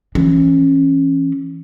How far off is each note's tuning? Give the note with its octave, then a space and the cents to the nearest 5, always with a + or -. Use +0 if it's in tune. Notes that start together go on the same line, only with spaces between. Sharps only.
E3 +0 C#4 -20